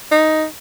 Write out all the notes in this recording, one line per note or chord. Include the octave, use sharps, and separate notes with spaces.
D#4